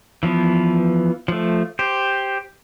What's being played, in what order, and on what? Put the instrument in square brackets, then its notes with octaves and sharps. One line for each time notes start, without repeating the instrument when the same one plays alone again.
[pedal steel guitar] E3 F3 B3
F3 A3
G4 C5